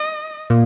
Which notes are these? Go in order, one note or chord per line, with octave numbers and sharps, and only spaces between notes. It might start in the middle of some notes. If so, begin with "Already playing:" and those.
Already playing: D#5
A#2